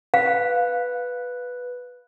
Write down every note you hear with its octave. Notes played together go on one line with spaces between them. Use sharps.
B4 F5